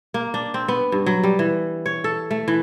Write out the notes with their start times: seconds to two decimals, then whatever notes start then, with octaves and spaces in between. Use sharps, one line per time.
0.14 A#3
0.34 D4
0.54 C4
0.68 B3
0.92 G2
1.06 F#3
1.23 G3
1.39 E3
1.86 C#5
2.04 A4
2.31 A3
2.48 E3